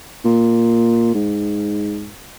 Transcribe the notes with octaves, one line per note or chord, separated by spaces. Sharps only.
A#2
G#2